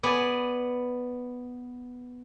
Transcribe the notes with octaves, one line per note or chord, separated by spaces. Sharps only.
B3 D5 G#5